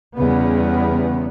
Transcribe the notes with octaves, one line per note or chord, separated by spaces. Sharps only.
E2 C#3 G3 B3